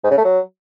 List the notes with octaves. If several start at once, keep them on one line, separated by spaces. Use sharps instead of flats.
G#2
C#3
A3
F#3